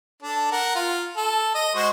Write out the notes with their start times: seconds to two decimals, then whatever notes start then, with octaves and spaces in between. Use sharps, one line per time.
0.23 D4 A4
0.52 A#4 F#5
0.76 F4
1.17 A4
1.55 D#5
1.76 G#3 F#4 C5